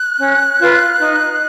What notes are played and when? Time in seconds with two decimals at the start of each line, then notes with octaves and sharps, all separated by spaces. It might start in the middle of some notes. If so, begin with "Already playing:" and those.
Already playing: F#6
0.19 C#4
0.59 F4 B4
0.99 D#4